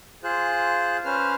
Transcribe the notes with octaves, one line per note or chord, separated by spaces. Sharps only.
F4 G#4 C5 F#6
C#4 B4 C5 F6